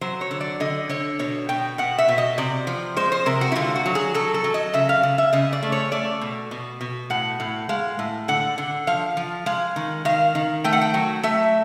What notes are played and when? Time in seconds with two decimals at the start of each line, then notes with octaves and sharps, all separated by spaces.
0.01 F#3 C5
0.21 C#5
0.31 D3
0.41 D5
0.60 D3 D#5
0.89 D3 C#5
1.19 B2 C#5
1.49 B2 G5
1.78 B2 F#5
1.98 E5
2.08 B2
2.18 D#5
2.38 C3 D5
2.67 F3
2.97 G#3 C5
3.12 C5
3.26 C3 A#4
3.41 F#4
3.52 E4
3.56 D3 F4
3.76 F#4
3.86 F#3
3.95 G#4
4.14 F#3 A4
4.34 A4
4.44 F#3
4.54 D#5
4.74 C#3 E5
4.89 F5
5.03 C#3
5.18 E5
5.33 C#3 D#5
5.53 D5
5.63 A3
5.72 C#5
5.92 A3 D5
6.21 B2
6.51 B2
6.81 B2
7.10 A2 F#5
7.40 A2
7.69 G#3 F5
7.99 A2
8.28 D3 F#5
8.58 D3
8.87 F3 F5
9.17 F3
9.46 G#3 F5
9.76 D#3
10.05 D#3 F5
10.35 D#3
10.64 A3 G5
10.73 F#5
10.81 G5
10.94 F#3
11.23 A3 E5